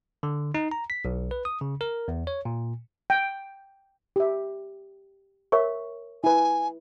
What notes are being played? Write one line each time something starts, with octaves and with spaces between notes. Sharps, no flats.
D3
D#4
A#5
B6
B1
B4
D#6
C#3
A#4
E2
C#5
A#2
G5
G4 E5
A#4 C#5 E5 C#6
E4 B4 G#5